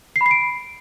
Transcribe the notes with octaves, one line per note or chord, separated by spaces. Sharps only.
C7
B5
C7
D7